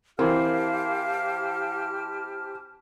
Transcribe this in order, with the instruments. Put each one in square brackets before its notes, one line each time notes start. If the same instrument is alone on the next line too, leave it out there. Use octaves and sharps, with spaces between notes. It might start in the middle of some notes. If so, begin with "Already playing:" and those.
[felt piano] E3 C4 [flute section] G4 A5 F6 [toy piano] A#4 A#5 [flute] F5